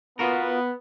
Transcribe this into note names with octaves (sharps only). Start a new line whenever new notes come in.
B3 F4 F#4 A#4